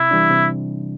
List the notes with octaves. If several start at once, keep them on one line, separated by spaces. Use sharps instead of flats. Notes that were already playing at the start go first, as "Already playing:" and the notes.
Already playing: C3 E4
E3 G3 D4
C3